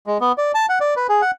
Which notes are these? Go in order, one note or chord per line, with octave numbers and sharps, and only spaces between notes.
G#3
B3
D5
A5
F#5
D5
B4
G#4
F#5